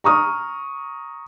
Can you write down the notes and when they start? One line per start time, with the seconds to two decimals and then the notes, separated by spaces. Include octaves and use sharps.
0.04 A#5 C#6 D#6 F6